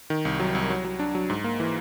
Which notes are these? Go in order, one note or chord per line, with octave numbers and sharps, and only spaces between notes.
D#3
C2
F#3
C2
F#3
F#3
D4
F#3
G#2
A#3
E3